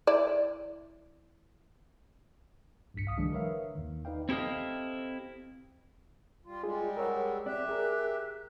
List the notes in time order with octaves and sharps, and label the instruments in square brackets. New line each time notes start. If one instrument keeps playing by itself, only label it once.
[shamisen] E4 D5
[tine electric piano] A1 D2 G2 B6 C#7
C2 F5 D#6 C#7
D3 E3 F#3 G#3 D4
A#4 B4 C#5 E5 F5
D#2 D#3
D#4 B4 D5 F5 G5
[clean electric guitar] C4 E4 G4 A4 D#5 F5
[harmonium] G3 F4 [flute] C6
[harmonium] G3 G#3 [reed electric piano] F4 G#4
[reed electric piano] A#4 C#5 F#5 [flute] E6
[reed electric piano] C4 D5 [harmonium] G4 E5 [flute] F#6
[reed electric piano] G#4 A#4